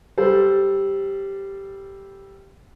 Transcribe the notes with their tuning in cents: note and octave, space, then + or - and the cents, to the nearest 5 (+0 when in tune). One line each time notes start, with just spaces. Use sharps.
G3 +0 A4 +0 C5 +0